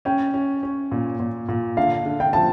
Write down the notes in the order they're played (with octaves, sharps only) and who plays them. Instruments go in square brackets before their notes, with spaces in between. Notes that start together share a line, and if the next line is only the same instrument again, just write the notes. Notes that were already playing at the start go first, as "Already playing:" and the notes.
[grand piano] C#4 [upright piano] G5
[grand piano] C#4
C#4
A#2
A#2
A#2
[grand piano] D3 [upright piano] F5
[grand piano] D3
[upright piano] G5
[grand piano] F3 [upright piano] A5